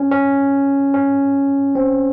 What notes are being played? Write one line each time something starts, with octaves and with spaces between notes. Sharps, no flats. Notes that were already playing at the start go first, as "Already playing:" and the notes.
Already playing: C#4
C#4
C#4
C4